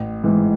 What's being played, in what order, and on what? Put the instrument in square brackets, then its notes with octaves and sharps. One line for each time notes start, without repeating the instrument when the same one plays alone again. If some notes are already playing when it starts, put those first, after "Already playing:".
Already playing: [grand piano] A1
G#2 E3